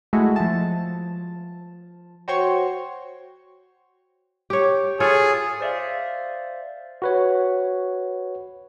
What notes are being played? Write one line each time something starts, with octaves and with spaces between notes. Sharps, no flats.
G#3 A3 E4 F#4 G#4 A4
F3 A5
F#4 C5 C#5 G5 C6 C#6
G4 C#5
F4 G#4 A4 C#5
C5 D5 E5 F5
F#4 B4 C#5